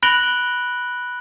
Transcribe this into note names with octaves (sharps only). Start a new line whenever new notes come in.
B5 F#6 A#6 D7 F#7 G7